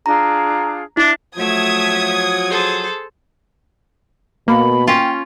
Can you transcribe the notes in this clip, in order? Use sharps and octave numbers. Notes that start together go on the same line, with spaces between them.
D4 F4 G#4 A#5
D4 E4
F3 F#3 A3 E5 D#6 G#6
G#4 A4 C5
B2 A#3 B5
C#4 F4 G5